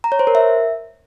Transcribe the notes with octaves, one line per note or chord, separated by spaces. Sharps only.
A#5
C#5
C5
A#4
E5